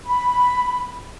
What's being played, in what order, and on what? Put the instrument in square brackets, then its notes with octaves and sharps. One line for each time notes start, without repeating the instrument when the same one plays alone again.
[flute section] B5